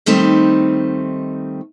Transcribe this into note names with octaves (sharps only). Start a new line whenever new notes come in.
D#3 G3 A3 C4 D#4